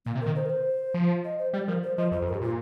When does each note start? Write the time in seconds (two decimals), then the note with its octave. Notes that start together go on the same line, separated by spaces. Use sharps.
0.05 A#2 A#3
0.15 C3
0.21 A#4
0.26 D#3
0.36 C5
0.46 A#4
0.50 C5
0.94 F3
1.24 D#5
1.39 C5
1.53 G3 G4
1.68 F3 A#4
1.83 C5
1.97 F3 D#5
2.12 F2 C5
2.22 F2
2.27 A#4
2.32 G2
2.34 G4
2.41 A#2 F4